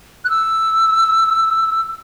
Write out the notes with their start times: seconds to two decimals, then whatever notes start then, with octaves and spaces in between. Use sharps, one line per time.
0.25 F#6
0.30 E6